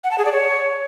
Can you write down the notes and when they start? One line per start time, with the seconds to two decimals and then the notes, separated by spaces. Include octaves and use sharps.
0.04 F#5
0.11 A5
0.18 G#4
0.25 D5
0.32 C#5